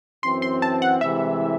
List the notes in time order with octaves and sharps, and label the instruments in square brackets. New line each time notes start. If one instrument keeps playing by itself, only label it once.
[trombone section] F#2 E3 C4 [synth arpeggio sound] C6
[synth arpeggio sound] C6
A5
F#5
[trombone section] C2 C3 E3 G#3 [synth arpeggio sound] E5